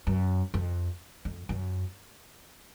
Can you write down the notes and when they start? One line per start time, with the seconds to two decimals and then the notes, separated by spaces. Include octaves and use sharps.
0.07 F#2
0.54 F2
1.25 F2
1.49 F#2